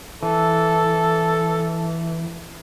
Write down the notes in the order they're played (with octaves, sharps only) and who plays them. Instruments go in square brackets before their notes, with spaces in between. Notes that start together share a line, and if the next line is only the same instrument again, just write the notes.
[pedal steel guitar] E3 [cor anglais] A4